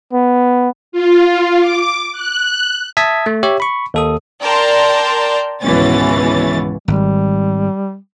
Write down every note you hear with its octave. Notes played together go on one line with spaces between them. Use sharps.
B3
F4
D6
F#6
E5 A5 D#6 G#6 B6
A3
G4 C#5 E5
B5 C#6
D#2 A4 D#6
A#4 D5 G5 A5 A#5 C6
G#1 C#2 B2 E3 C#4 A6
G#1 G3